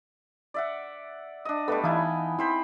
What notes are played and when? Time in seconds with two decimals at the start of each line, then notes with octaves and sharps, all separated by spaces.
0.54 D5 E5 F#5
1.45 D4 D#5
1.68 G3 A3 B3 A4 B4 D#5
1.84 E3 D#4 E4 F5 G#5 A5
2.39 C4 E4 C5 B5